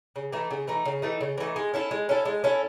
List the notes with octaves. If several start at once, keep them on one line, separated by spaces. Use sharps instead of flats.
C#3
E3 A3 D#4
C#3
E3 A3 D#4
C#3
E3 A3 D#4
C#3
E3 A3 D#4
G#3
C#4 E4 A4
G#3
C#4 E4 A4
G#3
C#4 E4 A4